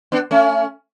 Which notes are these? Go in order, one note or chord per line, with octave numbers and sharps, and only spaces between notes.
B3 D4
A3 C#4